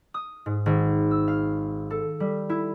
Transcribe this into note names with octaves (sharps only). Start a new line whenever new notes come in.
D#6
G#2
G#1
E6
F5
A4
G3
E4